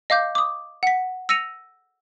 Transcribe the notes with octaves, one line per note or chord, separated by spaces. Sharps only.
D#5 F5 D6 G6
D6 D#6
F#5 B6
E6 A#6 C#7 D#7 F7